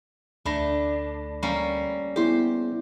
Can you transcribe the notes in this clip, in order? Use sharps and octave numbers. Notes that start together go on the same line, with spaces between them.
D2 A3 D4 B5 A#6
G3 A#3 C#4
B3 E4 G4 G#4 C5